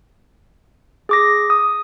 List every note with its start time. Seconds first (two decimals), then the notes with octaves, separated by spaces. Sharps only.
1.09 G#4 D6 A#6
1.50 D#6